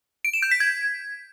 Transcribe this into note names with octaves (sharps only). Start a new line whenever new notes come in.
D7
E7
G6
B6
G#6